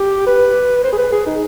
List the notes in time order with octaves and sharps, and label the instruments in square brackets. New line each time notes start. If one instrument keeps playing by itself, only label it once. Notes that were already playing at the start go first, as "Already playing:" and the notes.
Already playing: [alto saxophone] G4
B4
C5
G#4
B4
G#4
D#4